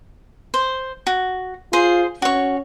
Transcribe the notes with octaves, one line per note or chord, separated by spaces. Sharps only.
C5
F#4
F4 G#4 C5
C#4 F#4 C#5